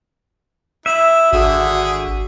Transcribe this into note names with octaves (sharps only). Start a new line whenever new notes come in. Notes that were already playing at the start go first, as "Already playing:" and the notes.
E4 E5
G#1 D3 F#4 G#4 D#6